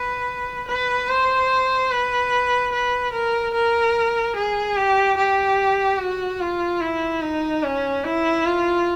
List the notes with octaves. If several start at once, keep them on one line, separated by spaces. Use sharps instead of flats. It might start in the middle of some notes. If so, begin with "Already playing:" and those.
Already playing: B4
B4
C5
B4
B4
A#4
A#4
G#4
G4
G4
F#4
F4
E4
D#4
C#4
E4
F4